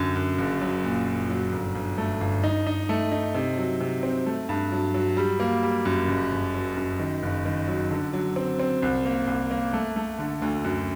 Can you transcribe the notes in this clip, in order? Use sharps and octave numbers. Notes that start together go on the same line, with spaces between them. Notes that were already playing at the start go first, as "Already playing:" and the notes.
Already playing: F#2 D3
F#2
F#1
F#3
A#2
A#2
F#3
G1
G1
A3
G1
D#4
D#4
A3
D#4
C3
F#3
C3
C4
A3
G2
F#3
F#3
G3
A#3
G3
F#2
F#1
F#1
F#3
F#2
D#3
F#1
D#3
F#3
D3
F#3
C4
C4
C2
A#3
C2
A#3
A3
A3
D3
D2
F#2